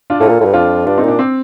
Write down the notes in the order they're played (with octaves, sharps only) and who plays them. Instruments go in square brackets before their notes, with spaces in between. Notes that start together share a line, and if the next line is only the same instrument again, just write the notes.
[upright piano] D4 F4
[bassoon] A2 [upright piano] F4 A4
[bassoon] A#2
A2
G2
[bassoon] F2 [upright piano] D4 F4
[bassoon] G2 [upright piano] D4 F4
[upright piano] C4 D#4
[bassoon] A#2 [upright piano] D4
[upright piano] C4